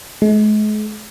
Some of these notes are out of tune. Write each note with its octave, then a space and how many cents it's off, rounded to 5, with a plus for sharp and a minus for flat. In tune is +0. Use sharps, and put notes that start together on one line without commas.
G#3 +40